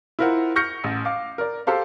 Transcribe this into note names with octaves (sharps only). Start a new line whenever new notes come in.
E4 F4 A#4 C5 F#5
C#6 F6 G6 A#6 C#7
A1
F5 D6
A#4 D5
G4 A4 C5 F5